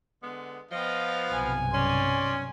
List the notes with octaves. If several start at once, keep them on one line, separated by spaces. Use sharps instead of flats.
D3 G#3 B3
F3 B3 D#5 F5 G5
B1 G2 C3 G#5
C#4 D5 C6